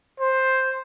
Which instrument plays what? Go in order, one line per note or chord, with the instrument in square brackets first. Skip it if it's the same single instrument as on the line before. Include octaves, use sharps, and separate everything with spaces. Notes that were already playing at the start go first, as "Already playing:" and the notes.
[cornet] C5